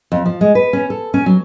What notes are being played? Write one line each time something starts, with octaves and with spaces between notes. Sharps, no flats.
F2
F3
G#3
B4
C#4
A4
C#4
F#3